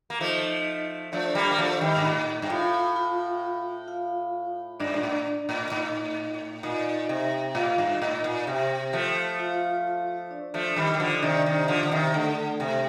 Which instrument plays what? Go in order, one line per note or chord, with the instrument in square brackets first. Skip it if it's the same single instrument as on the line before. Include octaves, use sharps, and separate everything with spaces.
[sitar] A#3
[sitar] F3 A3 [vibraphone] D#4 D#5
[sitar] F3 A3 [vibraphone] D4 D5
[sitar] G3 A#3
A#3
F3 A3
D#3 G3
G2
[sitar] A2 [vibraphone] D#4 D#5
[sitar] G2 [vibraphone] G5
[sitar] A2 [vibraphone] F4 F5
[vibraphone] F4 F5
F4 F5
[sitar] G2 [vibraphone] D4 D5
[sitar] A#2
A2
A2
[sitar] A2 [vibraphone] D#4 D#5
[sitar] A#2 [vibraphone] D#4 D#5
[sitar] C3
[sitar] A2 [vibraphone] F4 F5
[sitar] G2
[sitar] A2 [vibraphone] D#4 D#5
[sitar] A#2
[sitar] C3 [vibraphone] G4 G5
[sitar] F3 A3
[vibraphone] F4 F5
D4 D5
[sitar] F3 A3
D#3 G3
G3
D3 F3
[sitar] C3 D#3 [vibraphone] D4 D5
[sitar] C3 D#3
D3 F3
D3
C3 D#3
[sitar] D3 [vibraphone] A3 A4
[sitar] C3